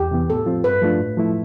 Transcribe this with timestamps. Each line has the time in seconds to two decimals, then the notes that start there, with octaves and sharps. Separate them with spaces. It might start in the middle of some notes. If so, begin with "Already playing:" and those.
Already playing: E2 G4
0.11 C3 E3 B3
0.30 A2 A4
0.46 F3 C4 F4
0.64 G2 B4
0.82 F3 A3 D4 F4
1.00 A2
1.17 F3 A3 E4